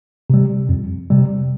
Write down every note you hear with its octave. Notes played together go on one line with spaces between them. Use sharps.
C3 G3
F2
C3 G3